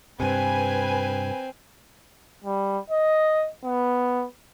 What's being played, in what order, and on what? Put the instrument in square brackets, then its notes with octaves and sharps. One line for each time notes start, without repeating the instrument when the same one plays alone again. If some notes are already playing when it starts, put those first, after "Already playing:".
[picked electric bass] G2 C3 [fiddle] C4 [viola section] B4 G#5
[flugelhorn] G3
D#5
B3